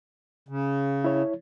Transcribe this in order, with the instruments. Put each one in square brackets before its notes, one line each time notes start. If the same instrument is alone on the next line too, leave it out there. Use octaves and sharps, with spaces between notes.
[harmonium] C#3
[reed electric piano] E4 C#5